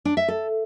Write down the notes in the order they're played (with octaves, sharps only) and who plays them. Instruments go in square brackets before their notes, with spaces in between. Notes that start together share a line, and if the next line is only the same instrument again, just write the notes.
[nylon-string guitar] D4
E5
A4